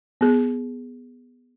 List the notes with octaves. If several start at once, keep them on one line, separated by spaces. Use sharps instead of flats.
B3 G#4